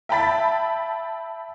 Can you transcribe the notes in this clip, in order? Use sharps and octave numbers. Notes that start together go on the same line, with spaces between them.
E5 G5 A5 B5 A6 B6